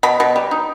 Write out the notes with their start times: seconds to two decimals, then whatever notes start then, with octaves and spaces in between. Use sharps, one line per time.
0.03 B2 B5
0.20 B2
0.36 G3
0.51 D#4